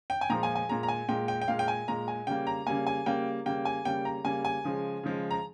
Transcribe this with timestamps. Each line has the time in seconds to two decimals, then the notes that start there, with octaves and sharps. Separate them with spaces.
0.10 G5
0.21 G#5
0.30 A#2 F3 G#3 A#5
0.43 G#5
0.55 G#5
0.69 A#2 G#3 A#5
0.83 A#5
0.88 G#5
1.09 A#2 G#3 G5
1.28 G5
1.42 G5
1.48 A#2 G#3 F5
1.59 G5
1.68 G#5
1.88 A#2 G#3 A#5
2.08 G#5
2.27 C#3 G3 A#3 G5
2.47 A#5
2.67 C#3 G3 A#3 G#5
2.87 G#5
3.06 C#3 G3 A#3 G5
3.45 C#3 G3 A#3 G5
3.65 G#5
3.85 C#3 G3 A#3 G5
4.05 A#5
4.24 C#3 G3 A#3 G#5
4.45 G#5
4.64 C#3 F3 G#3
5.03 C#3 F3 G#3
5.31 A#5